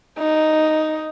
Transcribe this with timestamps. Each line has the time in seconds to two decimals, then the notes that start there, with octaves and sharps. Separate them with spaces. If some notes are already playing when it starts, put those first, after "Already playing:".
0.19 D#4